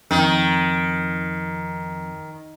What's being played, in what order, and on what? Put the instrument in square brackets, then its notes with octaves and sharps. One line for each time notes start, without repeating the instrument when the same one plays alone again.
[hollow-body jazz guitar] F2 [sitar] D#3